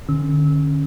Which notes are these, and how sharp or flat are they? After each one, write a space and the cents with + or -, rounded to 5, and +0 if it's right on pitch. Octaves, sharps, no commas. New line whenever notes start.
D3 +30 C#4 -10 E6 -25